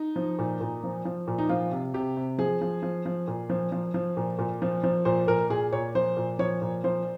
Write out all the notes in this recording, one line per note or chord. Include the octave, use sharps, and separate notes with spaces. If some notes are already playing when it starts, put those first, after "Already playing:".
Already playing: D#4
F3
A#2
A#2
F3
F3
A#2
D#4
F3 F4
C3
C3 G4
C3
F3 G#4
F3
F3
F3
A#2
F3
F3
F3
A#2
A#2
F3
F3
A#2 C5
A#2 A#4
A#2 G#4
A#2 C#5
F3 C5
A#2
F3 C#5
A#2
F3 C5